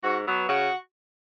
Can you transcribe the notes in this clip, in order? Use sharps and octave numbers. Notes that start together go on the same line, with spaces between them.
G#2 F#4
F#3 B3
C#3 F#4